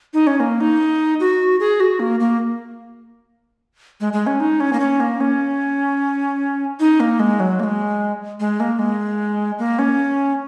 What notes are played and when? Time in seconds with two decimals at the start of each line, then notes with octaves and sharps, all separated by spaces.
0.14 D#4
0.27 C#4
0.40 A#3
0.60 D#4
1.20 F#4
1.60 G#4
1.80 F#4
2.00 A#3
2.20 A#3
4.01 G#3
4.13 G#3
4.27 C#4
4.40 D#4
4.60 C#4
4.73 A#3
4.80 C#4
5.00 A#3
5.20 C#4
6.80 D#4
7.00 A#3
7.20 G#3
7.40 F#3
7.60 A#3
7.63 G#3
8.40 G#3
8.60 A#3
8.79 G#3
9.59 A#3
9.79 C#4